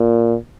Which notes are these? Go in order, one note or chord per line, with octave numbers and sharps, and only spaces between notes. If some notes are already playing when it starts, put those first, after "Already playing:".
Already playing: A#2